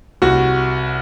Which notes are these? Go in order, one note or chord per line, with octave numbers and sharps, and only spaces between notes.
C2 F#4